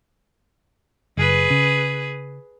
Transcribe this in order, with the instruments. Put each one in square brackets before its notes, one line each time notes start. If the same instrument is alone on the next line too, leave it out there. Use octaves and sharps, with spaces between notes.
[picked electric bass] F#1 [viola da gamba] G#4 B4
[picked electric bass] C#3